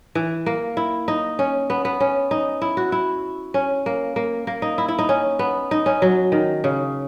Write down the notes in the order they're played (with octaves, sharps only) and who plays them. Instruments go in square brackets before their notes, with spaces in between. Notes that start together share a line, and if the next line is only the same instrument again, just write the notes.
[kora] E3
A#3
E4
D#4
C#4
B3
B3
C#4
D#4
E4
F#4
E4
C#4
A#3
A#3
A#3
D#4
E4
E4
D#4
C#4
B3
D#4
C#4
F#3
D#3
C#3